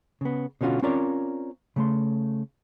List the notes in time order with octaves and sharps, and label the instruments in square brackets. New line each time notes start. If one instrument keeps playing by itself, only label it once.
[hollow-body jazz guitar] C#3 B3
B2 D3 C#4 F4 F#4
C4 C#4 F4 A#4 C#5 D5
C#3 A3 C6